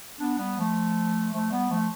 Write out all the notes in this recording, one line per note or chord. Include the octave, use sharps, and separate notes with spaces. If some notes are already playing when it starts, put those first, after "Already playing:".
B3 D4
G3 B3
F3 A3
F3 A3
G3 B3
F3 A3